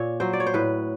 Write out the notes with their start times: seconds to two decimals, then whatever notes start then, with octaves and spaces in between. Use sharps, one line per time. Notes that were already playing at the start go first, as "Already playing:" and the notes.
Already playing: A#2 C#5
0.20 F#3 C5
0.33 D5
0.40 C#5
0.47 C5
0.54 A2 B4